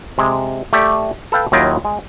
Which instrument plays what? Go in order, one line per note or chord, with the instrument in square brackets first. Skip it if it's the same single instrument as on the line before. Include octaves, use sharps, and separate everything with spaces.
[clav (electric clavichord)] C3 G#3
A3 G4 D5
A4 B4 F5 G5
D#2 F#3 E4 F4 D#5 G5
G#3